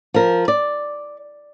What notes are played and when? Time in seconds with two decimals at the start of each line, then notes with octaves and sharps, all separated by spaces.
0.14 F3 A#4
0.48 D5